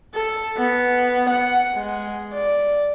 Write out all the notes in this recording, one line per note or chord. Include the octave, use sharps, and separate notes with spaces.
A4
B3
F#5
G#3
D5